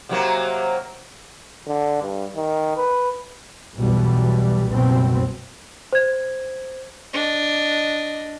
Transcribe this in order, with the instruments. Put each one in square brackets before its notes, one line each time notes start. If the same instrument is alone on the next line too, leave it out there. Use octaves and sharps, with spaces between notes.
[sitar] C3 F#3 A#3
[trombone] D3
G2
D#3
B4
[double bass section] B1 E2 B2 E3 G3
F#1 C2 B2 C4
[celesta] C5 G#6
[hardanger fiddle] D4 D#5